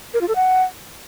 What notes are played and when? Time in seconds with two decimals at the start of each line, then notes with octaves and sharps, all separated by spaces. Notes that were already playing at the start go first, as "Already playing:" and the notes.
0.14 A#4
0.21 F4
0.28 A4
0.36 F#5